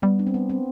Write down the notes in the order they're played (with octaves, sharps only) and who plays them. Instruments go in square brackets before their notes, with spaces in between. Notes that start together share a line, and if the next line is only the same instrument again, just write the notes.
[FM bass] G3 [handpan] B3
[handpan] D4
C4
B3
C4